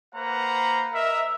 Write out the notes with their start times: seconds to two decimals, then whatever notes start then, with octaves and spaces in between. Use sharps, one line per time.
0.15 A#3 B4 C5 F#5 A#5
0.93 A#4 D#5 E5